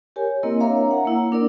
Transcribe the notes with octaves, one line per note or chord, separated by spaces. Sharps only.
G4 A#4 C#5 G#5
A#3 C4 E4 A#4 D#5
D4 A#4 C#5 E5 F5 A#5
F#5 A#5
A#3 E4
A#3 D4 A#4 D5